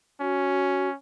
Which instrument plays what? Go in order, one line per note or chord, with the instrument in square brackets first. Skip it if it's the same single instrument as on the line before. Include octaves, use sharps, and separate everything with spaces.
[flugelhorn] C#4 [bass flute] F#4